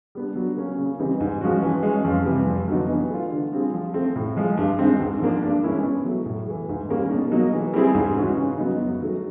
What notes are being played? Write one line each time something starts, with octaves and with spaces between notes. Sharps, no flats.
G3 B3 D4
F#3
A#3 C#4
C#3
E3 G3 C4 D#4
G#2
F3 G#3 C#4 F#4
E3
G#3 C#4
F2
C3 E3 G3
F2
D3 F#3 B3 D#4
E3
A3 D4 F4
D3
G3 C4 F4 G#4
F3
A3 C4
A2
F3 G#3
G2
D#3 G#3 C4
G#2
F3 A#3 D4
G2
E3 G#3 C#4 E4
B2
F#3 A3
A2
E3 A3
G#2
D#3 G3 A#3 C#4
B2
F#3 A#3 D#4
E3
G3 C4 E4 G#4
G#2
E3 G#3 C#4 F#4
C#3
F#3 B3 D#4
F#2
D#3 F#3 A3